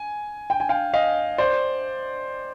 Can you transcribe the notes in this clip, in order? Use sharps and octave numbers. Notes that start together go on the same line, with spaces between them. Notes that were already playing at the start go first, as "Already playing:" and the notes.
Already playing: G#5
G5
G#5
F5 G5
D#5 F5
C5 D5